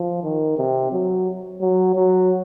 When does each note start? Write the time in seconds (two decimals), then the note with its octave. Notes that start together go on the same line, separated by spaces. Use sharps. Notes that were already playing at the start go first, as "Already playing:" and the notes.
Already playing: F3
0.23 D#3
0.58 C3
0.92 F#3
1.61 F#3
1.95 F#3